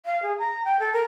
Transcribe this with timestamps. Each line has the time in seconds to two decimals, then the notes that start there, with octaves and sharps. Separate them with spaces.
0.06 F5
0.23 G#4
0.39 A#5
0.65 G5
0.80 A4
0.93 A#4